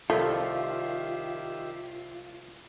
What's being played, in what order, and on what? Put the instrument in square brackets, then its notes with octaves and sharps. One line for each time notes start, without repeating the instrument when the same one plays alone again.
[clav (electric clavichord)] C2 F3 [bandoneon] D#3 G4 E5 [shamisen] A3 [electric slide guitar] F4